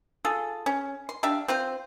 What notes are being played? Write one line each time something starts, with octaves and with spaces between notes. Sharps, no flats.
F4 G#4 A4
C#4
C6
D4 G4 E5 F5
C4 F4 C5